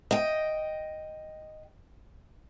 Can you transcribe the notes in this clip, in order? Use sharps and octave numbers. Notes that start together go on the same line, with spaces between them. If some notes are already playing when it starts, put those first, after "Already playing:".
D#5 G5